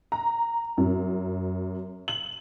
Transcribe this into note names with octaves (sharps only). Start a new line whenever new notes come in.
A#5
F#2
F#7